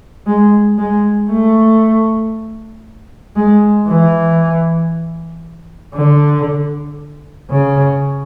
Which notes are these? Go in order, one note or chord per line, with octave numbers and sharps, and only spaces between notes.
G#3
G#3
A3
G#3
E3
D3
C#3